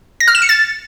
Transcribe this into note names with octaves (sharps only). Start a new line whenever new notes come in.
A#6
F6
E7
C#7
A6